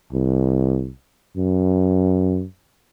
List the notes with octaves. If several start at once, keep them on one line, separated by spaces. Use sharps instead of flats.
C2
F#2